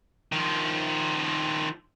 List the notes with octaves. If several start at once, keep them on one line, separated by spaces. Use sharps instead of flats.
D#3 F3